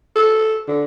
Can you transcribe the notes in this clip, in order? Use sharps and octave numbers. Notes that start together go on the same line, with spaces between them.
A4
D3